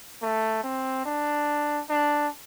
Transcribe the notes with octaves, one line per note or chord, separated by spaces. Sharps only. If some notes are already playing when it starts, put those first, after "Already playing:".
A3
C4
D4
D4